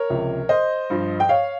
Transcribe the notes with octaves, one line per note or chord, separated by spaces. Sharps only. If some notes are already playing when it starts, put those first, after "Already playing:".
Already playing: A#4 C#5
C#2 C3 F3
C5 D#5
G2 F3
G5
C#5 F5